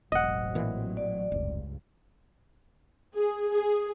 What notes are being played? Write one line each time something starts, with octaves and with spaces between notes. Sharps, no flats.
E1 A1 F#3 C4 D#5 F#5
A#2 E3
D5
F1 C#2 G2
G#4
G#4